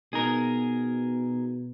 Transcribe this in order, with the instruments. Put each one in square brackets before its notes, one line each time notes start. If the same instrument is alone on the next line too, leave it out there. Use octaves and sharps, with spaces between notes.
[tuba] B2 [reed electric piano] B3 D#4 [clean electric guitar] G#4 A#4